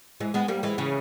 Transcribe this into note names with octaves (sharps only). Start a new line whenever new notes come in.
E3 G#3
G#3 B3
G3 A#3
E3 G#3
C#3 E3